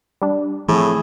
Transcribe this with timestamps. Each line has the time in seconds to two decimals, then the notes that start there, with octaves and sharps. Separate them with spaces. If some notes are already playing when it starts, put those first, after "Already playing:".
0.22 G3 D4
0.68 A2 E3 F3 A3 C4 G#4